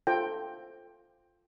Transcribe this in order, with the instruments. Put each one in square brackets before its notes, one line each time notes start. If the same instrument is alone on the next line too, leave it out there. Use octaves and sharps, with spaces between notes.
[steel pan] F4 A4 C5 G5